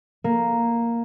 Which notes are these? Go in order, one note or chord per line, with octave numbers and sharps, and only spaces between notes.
A#3